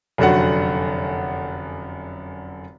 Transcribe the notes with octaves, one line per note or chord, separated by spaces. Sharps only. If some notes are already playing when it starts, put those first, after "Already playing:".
F1 F#2 D3 F#4 F#5